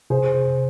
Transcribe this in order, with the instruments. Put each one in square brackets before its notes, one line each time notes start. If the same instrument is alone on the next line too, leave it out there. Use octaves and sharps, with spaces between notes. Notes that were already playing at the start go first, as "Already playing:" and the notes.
[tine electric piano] C3 [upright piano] G#4 C5